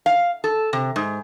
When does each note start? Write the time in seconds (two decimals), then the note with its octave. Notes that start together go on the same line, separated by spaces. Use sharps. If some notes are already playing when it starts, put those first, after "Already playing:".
0.06 F5
0.44 A4
0.73 C3
0.96 G#2